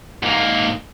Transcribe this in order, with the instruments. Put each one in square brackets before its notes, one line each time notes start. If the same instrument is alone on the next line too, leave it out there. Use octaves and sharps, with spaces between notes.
[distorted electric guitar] G#2 A#3